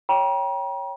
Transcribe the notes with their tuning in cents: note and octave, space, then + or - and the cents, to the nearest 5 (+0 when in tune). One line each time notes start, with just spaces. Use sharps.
C#5 +0 G5 +0 A#5 +40